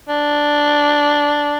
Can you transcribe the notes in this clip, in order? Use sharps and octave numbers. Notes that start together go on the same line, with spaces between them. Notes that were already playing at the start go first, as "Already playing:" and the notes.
D4